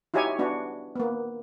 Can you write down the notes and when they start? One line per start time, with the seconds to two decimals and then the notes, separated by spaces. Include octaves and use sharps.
0.14 D#4 E4 F#4 G4 C#5 G#5
0.39 B3 D4 F#4
0.96 A#3 B3